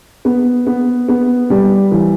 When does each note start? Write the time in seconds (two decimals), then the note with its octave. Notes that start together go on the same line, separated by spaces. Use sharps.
0.25 B3
0.67 B3
1.08 B3
1.50 G3
1.91 E3